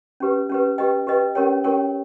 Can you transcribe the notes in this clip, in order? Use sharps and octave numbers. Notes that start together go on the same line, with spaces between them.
C#4 G4 B4
C#4 G4 B4
G4 B4 D#5 G5
G4 B4 D#5 G5
C#4 G4 A#4 C#5 G5
C#4 G4 A#4 C#5 G5